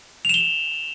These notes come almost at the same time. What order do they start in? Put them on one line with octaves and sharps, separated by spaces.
F7 E7 G7